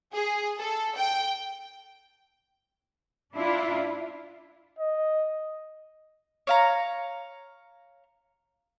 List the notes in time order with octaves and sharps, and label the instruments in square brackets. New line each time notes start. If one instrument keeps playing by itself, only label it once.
[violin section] G#4
A4
G5
[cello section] D4 E4 F4
[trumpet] D#5
[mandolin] C#5 F5 A#5